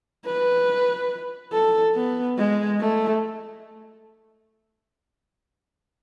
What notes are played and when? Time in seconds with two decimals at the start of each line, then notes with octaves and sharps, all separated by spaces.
0.26 B4
1.52 A4
1.95 B3
2.38 G#3
2.80 A3